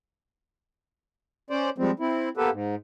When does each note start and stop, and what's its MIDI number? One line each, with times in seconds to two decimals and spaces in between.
1.50 1.70 61
1.50 1.70 72
1.50 1.70 74
1.78 1.91 53
1.78 1.91 55
1.78 1.91 56
1.78 1.91 60
2.00 2.29 60
2.00 2.29 64
2.37 2.50 58
2.37 2.50 59
2.37 2.50 67
2.37 2.50 69
2.37 2.50 71
2.51 2.75 44